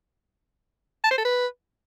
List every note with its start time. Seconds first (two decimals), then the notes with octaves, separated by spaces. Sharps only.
1.04 A5
1.11 C5
1.18 A4
1.25 B4